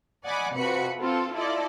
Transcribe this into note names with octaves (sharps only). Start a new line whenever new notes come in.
D5 D#5 F#5 G#5 B5 D6
F2 C3 F#4 B4 B5 C#7
C4 F4 A4
E4 F4 A4 D5 D#5